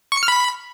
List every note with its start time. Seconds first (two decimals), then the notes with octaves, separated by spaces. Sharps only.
0.12 C#6
0.17 C#7
0.23 F6
0.28 B5